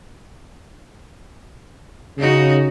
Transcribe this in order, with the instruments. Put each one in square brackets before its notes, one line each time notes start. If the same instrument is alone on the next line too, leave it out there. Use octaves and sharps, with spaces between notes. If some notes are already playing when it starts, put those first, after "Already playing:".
[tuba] C#3 [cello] D#4 F#4